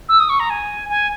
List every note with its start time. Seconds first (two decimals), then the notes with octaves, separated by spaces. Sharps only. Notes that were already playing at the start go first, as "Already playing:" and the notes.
0.09 E6
0.20 D#6
0.30 C#6
0.40 A#5
0.50 G#5
0.89 G#5